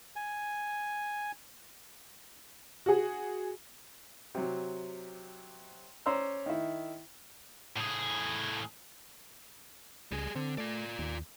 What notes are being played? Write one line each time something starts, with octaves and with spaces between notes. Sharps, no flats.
G#5
F#4 G#4
C3 F#3
C#4 C5 D5 A#5 E6
D#3 E4
A2 G#4
C#2 G3 G#4
D3 C4
A3 F4 D5
D#2